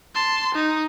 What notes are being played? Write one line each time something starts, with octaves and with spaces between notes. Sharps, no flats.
A5 C6
D#4